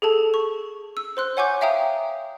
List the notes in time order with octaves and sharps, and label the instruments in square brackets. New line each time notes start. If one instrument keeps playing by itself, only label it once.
[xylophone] G#4 A4 A5
C#6
E6
C5 C6 F#6
C#5 F#5 G#5 C#6 D6 G6
E5 F5 G5 A#5 D#6